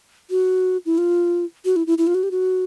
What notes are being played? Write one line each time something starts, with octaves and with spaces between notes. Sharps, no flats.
F#4
E4
F4
F#4
E4
E4
E4
F4
F#4
G4
F#4